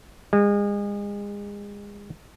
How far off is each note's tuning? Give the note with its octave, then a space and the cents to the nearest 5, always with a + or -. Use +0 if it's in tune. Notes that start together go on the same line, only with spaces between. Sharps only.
G#3 -35